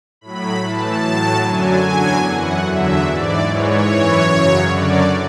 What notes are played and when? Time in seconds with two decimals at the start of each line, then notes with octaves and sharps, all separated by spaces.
0.21 A2 F#3 B5
0.62 A2 E3 A5
1.03 A2 F#3
1.43 F#2 D3 F#3 G#5
1.84 E2 D3 F#3
2.25 F#2 E3 F#5
2.65 E2 D3 F#3 E5
3.06 G#2 E3 D5
3.46 G#2 E3 C#5
3.88 F#2 E3
4.28 F#2 C#3 F#3
4.69 F#2 D3 F#3 D5